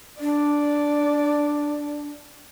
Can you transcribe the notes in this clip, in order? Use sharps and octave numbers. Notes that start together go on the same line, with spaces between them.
D4 D5